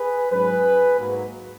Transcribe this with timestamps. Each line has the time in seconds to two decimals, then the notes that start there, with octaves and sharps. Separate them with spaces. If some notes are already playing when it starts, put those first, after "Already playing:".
Already playing: G#4 B4
0.31 G#2 F#3 C#4 G#4 B4
0.99 G#2 F#3 A#3